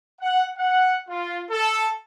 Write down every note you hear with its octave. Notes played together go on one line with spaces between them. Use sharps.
F#5
F#5
F4
A4